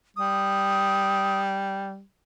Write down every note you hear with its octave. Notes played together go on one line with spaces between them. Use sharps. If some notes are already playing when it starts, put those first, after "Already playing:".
G3 D#6